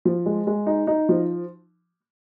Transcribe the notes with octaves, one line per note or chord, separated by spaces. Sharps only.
F3
G#3
G#3
D#4
D#4
F3